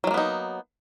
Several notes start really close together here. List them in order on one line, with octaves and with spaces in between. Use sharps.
F#3 G#3 A#3 B3 D#4